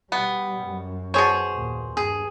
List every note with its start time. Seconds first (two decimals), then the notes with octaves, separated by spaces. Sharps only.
0.12 B2 G3 B3
0.63 F#2
1.14 B2 G#4 C5 C#5
1.52 D#2 A#2
1.97 G2 G#4